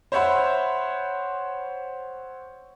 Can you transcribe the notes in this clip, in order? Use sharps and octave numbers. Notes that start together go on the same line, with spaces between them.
C5 C#5 E5 F#5 B5 C6